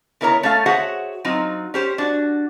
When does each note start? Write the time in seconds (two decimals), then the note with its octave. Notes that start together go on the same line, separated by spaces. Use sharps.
0.21 C#3 B3 E4 A#4 C#5 A#5
0.43 A3 C#4 A4 F5
0.66 F#4 G#4 C5 C#5 E5 F#5
1.25 F#3 C4 D#4 F4
1.74 C#4 G4 C5
1.98 D4 F#4